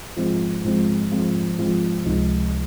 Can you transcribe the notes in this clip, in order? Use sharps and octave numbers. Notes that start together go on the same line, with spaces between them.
G#2 F3 G#3 C4 F4
G#2 F3 G#3 C4 F4
G#2 F3 G#3 C4 F4
G#2 F3 G#3 C4 F4
C#2 C3 F3 G#3 D#4